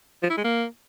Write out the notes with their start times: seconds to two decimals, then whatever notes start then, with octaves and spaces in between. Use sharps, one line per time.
0.23 F3
0.30 E4
0.37 G#3
0.45 A#3